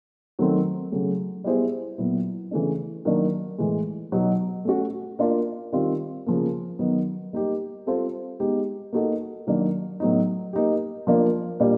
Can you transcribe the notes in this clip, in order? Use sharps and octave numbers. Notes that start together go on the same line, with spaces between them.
D#3 F#3 A3 C4
C#3 F#3 A3
G3 B3 E4 G#4 C5
A#2 F#3 B3 E4
C#3 E3 A3 D4
D#3 F#3 A#3 D4
A2 E3 G#3
B2 F#3 B3 D#4 F#4
A3 C#4 F#4
A#3 D4 F4 A#4
D#3 G3 C4 F4
C#3 F3 A#3
D#3 F#3 B3 D#4
G3 A#3 D#4 G4
G3 C4 F4 A4 C5
G#3 B3 D#4 G4
A#3 D#4 F#4 A4
D#3 F#3 A#3 D4
A2 F#3 B3 D#4
A#3 D#4 G4
F3 A#3 D4 F4 A#4
A#2 G3 A#3 D4 F4